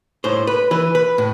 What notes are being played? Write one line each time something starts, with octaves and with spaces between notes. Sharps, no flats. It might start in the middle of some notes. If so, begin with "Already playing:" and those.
A2 C5
B4
E3 B4
B4
A2